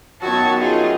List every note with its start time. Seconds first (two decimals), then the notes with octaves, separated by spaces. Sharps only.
0.22 F#2 D#3 F#3 B3 F#4 A5 G#6
0.60 G3 A3 D#4 F4 G#4